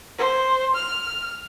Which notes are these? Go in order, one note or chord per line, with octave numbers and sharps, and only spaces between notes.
C5
F6